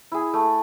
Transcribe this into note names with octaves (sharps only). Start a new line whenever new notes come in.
E4 G#4
A3